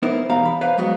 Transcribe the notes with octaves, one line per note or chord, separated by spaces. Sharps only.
B3 D#4 E4 A#4 C5
E2 B2 G3 F5 A#5
B5
B4 C5 F5
F#3 G#3 B3 F#4 F#5